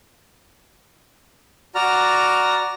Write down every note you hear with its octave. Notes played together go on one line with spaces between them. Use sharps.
F#4 D5 A#5 F6